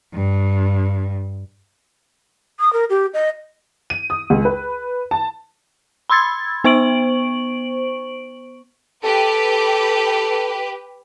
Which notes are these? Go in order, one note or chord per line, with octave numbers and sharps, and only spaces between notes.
G2
D#6
A#4
G4
D#5
D#7
D#6
C#2
B4
A5
B5 C6 E6 G#6 A6
B3 C5 C#6 D7 F#7
G4 A4 B4